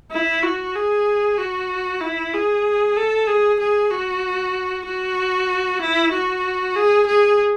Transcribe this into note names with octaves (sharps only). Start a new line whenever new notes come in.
E4
F#4
G#4
F#4
E4
G#4
A4
G#4
G#4
F#4
F#4
E4
F#4
G#4
G#4